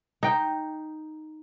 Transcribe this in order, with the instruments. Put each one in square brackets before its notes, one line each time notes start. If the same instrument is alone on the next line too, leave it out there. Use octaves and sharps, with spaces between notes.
[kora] D#4 G5